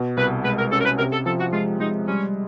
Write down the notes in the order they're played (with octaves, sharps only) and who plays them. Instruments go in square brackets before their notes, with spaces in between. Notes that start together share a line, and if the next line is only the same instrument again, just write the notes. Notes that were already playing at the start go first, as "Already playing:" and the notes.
Already playing: [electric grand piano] B2
[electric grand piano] C2 [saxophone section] B4
[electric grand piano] G#3 [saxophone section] B4
[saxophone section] A#4
[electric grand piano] C#4 [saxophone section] A4
[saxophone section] A#4
B4
[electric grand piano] C3 [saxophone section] A#4
[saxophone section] A4
[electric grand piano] F3 [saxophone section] A4
[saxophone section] F#4
[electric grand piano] G#3 [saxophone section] F4
[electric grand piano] G#3 [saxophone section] D#4
[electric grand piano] G3 [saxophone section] C#4